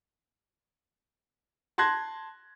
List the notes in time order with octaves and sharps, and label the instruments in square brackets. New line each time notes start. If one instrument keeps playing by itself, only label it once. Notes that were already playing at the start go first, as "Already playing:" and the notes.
[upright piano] A5 C6 F#6 G#6 A#6